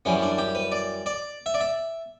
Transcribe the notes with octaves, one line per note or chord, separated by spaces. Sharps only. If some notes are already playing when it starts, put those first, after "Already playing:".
F#2 E3 G3 C#4
D4
G4
B4
D5
D5
E5
D5
E5